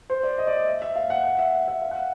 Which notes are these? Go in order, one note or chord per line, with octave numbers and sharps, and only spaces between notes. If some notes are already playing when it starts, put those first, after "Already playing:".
C5
D5
D#5
D5
D#5
E5
E5
F5
F#5
F#5
E5
E5
F5
F#5